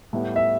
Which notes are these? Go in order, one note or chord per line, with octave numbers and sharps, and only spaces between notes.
A2 G3 B3
E5